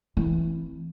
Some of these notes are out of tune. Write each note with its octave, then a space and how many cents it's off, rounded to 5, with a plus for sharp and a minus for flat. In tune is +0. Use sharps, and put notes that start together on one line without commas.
E3 +0 C4 +0